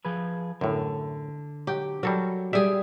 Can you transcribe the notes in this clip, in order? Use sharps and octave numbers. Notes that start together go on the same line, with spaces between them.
F3 G#4 B4
F#2 A2 D3
F#3 G4
F#3 G3 A4 A#4
G3 G4 G#4 E5